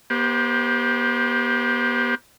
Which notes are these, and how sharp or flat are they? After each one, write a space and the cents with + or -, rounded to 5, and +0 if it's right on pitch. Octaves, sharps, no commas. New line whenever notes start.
B3 -40 G4 +5 C5 -5